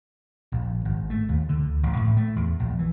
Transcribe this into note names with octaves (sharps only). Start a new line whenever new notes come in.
A#1
G#1
A3
D#2
D3
D2
A1
A2
A3
E2
A#1
E3